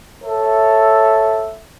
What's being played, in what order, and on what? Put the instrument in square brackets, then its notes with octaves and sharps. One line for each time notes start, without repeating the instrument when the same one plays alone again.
[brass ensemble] A4 C#5 E5